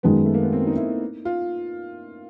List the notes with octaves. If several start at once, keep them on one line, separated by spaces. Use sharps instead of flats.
F#2 D#3 G#3 B3
A3
A#3
B3
C4
D#4
E4
F4